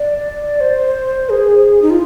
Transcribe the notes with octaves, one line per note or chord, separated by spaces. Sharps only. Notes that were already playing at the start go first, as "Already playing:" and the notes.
Already playing: D5
C5
G#4
D#4
F4